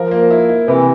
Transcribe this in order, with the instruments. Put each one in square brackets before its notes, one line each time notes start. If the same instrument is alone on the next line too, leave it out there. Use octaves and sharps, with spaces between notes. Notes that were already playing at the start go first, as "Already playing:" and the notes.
Already playing: [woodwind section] F3 [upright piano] A#4
[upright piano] A#3
E4
E4
[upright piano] C3 [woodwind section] E3